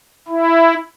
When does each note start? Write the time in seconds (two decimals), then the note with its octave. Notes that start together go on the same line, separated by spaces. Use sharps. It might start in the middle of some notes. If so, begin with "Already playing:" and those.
0.28 E4